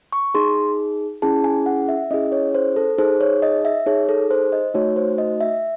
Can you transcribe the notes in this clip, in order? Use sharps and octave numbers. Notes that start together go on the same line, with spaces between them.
C#6
D#4 G#4 C6
C#4 E4 G#4 A5
G#5
F#5
E5
C#4 E4 G#4 D#5
C#5
C5
A4
D#4 G#4 C5
C#5
D#5
E5
D#4 G#4 C#5
A4
C5
D#5
A3 D#4 F#4 C#5
C5
D#5
E5